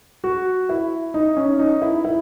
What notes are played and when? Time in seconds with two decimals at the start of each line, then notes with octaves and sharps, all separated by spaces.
0.24 F#4
0.69 E4
1.14 D#4
1.37 C#4
1.59 D#4
1.82 E4
2.05 E4